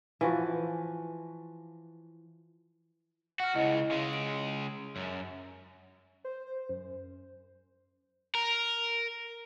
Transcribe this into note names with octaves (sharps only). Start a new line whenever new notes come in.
E3 F3 F#4
F#4 F#5 F6
C#2 C#3 E4 D#5
C#3 G#3
D7
F#2
C5
F#2
A#4